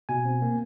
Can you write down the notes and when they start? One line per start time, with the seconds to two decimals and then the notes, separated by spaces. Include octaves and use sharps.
0.09 B2 G#5
0.25 C4
0.42 A#3